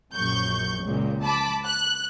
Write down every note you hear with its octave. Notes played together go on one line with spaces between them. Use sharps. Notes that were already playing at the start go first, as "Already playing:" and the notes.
A#1 F#2 C#6 G6
C#2 A#2
A5 B5 D6
F#6